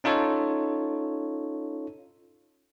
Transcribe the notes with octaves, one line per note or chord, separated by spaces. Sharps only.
C#4 D#4 F4 A4 C#5